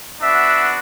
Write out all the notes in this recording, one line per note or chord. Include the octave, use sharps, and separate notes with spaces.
B3 D4 F#4 E5